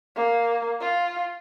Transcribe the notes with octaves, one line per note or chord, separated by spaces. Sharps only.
A#3
F4